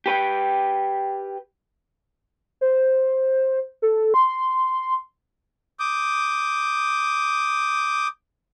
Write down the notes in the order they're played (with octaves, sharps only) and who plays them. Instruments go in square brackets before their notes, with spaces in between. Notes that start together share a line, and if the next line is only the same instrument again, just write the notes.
[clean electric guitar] G4 B4 G5
[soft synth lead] C5
A4
C6
[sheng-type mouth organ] D6 D#6 G6